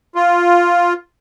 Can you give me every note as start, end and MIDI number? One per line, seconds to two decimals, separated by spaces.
0.16 0.93 65